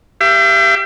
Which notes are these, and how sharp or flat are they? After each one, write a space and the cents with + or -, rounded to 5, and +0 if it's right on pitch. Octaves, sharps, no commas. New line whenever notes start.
G4 +0 E5 +45